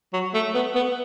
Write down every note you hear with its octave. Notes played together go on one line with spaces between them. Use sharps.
F#3
A3
B3
B3